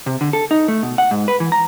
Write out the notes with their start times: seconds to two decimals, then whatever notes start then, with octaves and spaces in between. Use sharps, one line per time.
0.06 C3
0.21 D3
0.33 A4
0.51 D#4
0.68 A3
0.83 B2
0.98 F#5
1.11 G#2
1.28 B4
1.40 E3
1.52 A#5